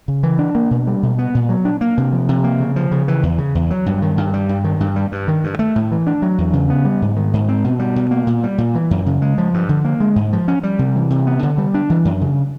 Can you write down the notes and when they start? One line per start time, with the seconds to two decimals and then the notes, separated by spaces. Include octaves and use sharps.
0.08 C#3
0.23 E3
0.39 D4
0.55 A#3
0.71 B2
0.87 G3
1.03 B2
1.19 B3
1.35 A#2
1.49 F#3
1.65 D4
1.81 A#3
1.97 C3
2.12 F3
2.29 C3
2.44 A#3
2.60 C#3
2.76 F3
2.91 C#3
3.08 E3
3.23 E2
3.38 C#3
3.55 E2
3.70 F#3
3.86 G2
4.02 D#3
4.17 G2
4.34 G3
4.49 G2
4.64 D#3
4.80 G2
4.96 G3
5.12 G2
5.28 D#3
5.44 G2
5.59 A3
5.76 A2
5.92 E3
6.07 D4
6.22 F#3
6.38 E2
6.53 C#3
6.70 B3
6.85 G3
7.02 G#2
7.16 D#3
7.33 G#2
7.49 C4
7.64 B2
7.79 G3
7.96 B2
8.11 A#3
8.27 A#2
8.44 G3
8.58 A#2
8.75 E3
8.91 F#2
9.06 C#3
9.22 G#3
9.38 F3
9.54 G2
9.69 D3
9.84 A#3
10.00 G#3
10.16 G#2
10.33 F3
10.48 C#4
10.63 G3
10.79 C3
10.95 E3
11.10 C3
11.27 B3
11.43 D3
11.58 G3
11.74 D4
11.90 E3
12.05 F#2
12.21 C#3